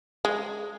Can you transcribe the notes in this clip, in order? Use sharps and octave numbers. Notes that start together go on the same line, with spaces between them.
G#3